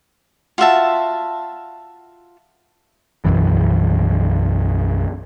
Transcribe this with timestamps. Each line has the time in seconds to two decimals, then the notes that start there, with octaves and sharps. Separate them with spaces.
0.58 F4 F#4 E5 A5
3.25 B1 F#2 E3